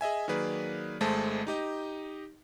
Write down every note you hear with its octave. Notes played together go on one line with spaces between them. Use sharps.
G#4 D#5 E5 G#5
D#3 F#3 A#3 G#4 B4 D5
G#1 G#3 A3 C5 A5
D#4 G4 D#5